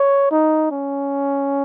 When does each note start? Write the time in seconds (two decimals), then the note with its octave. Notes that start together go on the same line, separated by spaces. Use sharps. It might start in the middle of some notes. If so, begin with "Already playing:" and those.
Already playing: C#5
0.31 D#4
0.71 C#4